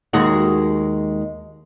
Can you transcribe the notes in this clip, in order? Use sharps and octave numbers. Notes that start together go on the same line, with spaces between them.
D#2 G#3 F#4